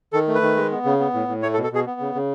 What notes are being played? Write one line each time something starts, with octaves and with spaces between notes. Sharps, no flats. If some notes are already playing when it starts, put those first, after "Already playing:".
D#3 A4
A3
B4
D#3
G#3
B3
C#3
B3
A2
A2
A3 C#5
A4
B2
A4
B2 G#4
B3
C#3
C#3